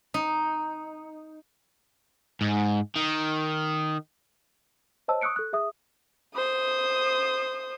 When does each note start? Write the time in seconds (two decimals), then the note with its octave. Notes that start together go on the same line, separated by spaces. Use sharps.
0.14 D#4
2.41 G#2
2.96 D#3
5.08 C5 C#5 D#5 A5 E6
5.21 C#6 D#6 E6 F#6 C#7 D7
5.36 A4 F#6
5.53 G#4 E5 D#6
6.35 C5 D#6